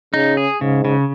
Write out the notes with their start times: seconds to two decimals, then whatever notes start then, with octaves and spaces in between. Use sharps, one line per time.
0.14 C#3 D#4
0.37 G#4
0.61 G#2 C#3
0.85 C#3